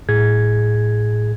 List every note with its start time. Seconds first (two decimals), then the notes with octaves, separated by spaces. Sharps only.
0.09 A2 G#4 G#6